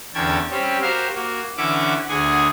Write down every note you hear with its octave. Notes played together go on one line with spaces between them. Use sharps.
E2 D3 C#4 G5 A5 G#6
G3 C4 C#4 G4
F#4 G4 A#4 C5 F5
A#3 F#4
D3 E3 C#4 E5 F#5 D6
D2 D4 G#4 F#5 G#5